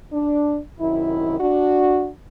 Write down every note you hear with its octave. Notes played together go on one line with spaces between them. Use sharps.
D4
F#2 C3 D#3 E4
D4 F#4